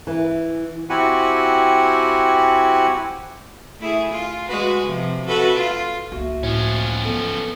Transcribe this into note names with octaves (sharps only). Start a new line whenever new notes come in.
E3
C4 E4 F#4 G4 F#5 G#5
A3 E4 G#4
F4
G#3 F#4 B4
C3 F3
F#4 A4 B4
F4
C#2 A#3 F#4 E5
A2 F3 C#4
F#3 B3 A4